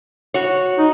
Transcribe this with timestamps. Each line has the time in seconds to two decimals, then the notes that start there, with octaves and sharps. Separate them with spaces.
0.34 F#4 C#5
0.79 D#4